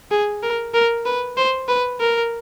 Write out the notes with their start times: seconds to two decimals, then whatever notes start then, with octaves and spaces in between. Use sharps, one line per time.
0.11 G#4
0.43 A#4
0.74 A#4
1.06 B4
1.37 C5
1.69 B4
2.00 A#4